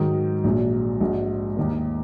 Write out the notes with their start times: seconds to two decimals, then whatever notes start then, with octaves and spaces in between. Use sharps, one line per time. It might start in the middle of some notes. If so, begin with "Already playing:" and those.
Already playing: G#2 D#3 F#3
0.44 A#1 A#2 F#3
1.00 A#1 G#2 G#3 F#4
1.57 D#2 D#3 A#3